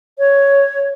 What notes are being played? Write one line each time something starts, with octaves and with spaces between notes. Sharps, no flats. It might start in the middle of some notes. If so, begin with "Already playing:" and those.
C#5